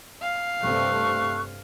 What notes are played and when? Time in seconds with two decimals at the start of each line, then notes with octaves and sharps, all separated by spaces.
0.22 F5
0.60 G2 C3 A3 A4 C#6 F#6